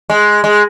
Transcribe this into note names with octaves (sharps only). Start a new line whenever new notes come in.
G#3
G#3